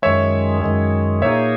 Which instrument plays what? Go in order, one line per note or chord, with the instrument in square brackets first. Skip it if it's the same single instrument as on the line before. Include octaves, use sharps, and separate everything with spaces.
[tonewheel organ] F#2 D#3 G#3 [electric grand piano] C#5 E5
[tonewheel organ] F#2 D#3 G#3
[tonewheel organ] A#2 A#3 D#4 G#4 [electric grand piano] C#5 E5